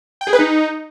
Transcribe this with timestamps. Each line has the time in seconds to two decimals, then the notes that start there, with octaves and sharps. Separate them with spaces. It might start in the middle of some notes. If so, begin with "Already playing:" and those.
0.21 G5
0.27 G#4
0.33 B4
0.39 D#4